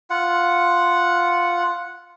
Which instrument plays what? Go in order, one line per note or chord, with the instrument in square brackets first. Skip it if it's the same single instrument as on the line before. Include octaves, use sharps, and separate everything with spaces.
[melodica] F4 F#5